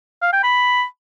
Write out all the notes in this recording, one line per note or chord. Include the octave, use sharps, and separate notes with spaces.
F5
G5
B5